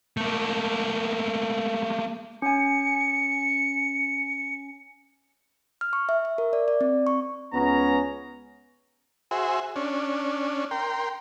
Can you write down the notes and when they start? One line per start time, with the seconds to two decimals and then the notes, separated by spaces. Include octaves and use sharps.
0.17 A3 A#3
2.42 C#4 G#5 C#7
5.81 F6
5.93 C#6
6.09 E5
6.25 E5
6.38 A#4
6.53 D5
6.68 D5
6.81 C4
7.07 C#6
7.53 C#2 B3 C#4 A#5
9.31 F#4 G#4 C5 E5
9.76 C#4 D4
10.71 A#4 G5 C6